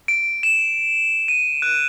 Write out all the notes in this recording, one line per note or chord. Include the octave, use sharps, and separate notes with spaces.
D7
E7
D#7
F#6